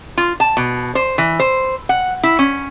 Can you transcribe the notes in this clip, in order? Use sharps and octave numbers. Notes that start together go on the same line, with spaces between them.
F4
A5
B2
C5
E3
C5
F#5
E4
C#4